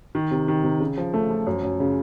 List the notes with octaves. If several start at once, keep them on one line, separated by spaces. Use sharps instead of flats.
D#3
C3
D#3
C3
C#3
F3
A3
F3
F#2
F#2
C#3